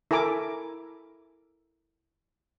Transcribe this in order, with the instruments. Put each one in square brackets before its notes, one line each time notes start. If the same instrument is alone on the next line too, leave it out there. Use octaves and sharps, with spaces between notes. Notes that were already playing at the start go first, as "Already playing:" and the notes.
[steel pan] E4 A4 A#4 G#5 D6